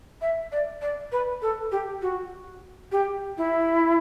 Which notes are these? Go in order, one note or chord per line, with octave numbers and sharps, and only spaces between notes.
E5
D5
D5
B4
A4
G4
F#4
G4
E4